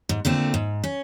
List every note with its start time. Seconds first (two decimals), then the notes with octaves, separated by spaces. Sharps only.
0.09 G#2
0.25 A#2 D3 A3 C4
0.54 G#2
0.84 C#4